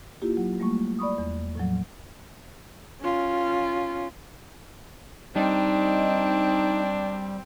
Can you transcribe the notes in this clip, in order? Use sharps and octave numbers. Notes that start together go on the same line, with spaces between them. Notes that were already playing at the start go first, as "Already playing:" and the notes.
A#3 E4 F4 G4
F#3
G3 A3 A#3 C#6
D5 B5 C#6 D#6
E2
A2 F3 F#3
C#4 F4
G3 C4 D4 D#4